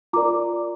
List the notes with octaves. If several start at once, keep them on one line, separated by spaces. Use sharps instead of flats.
F4 A#4 D5 A#5 D6